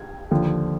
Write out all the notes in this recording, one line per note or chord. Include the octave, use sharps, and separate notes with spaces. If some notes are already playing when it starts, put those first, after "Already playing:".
Already playing: G#6
D#2 D3 F3